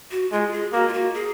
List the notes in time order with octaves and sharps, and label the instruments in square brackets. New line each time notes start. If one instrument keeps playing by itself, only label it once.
[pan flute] F#4
[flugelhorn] G#3 [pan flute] F4
[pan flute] G#4
[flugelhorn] A#3 [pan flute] F#4
[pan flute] F4
F#4
G#4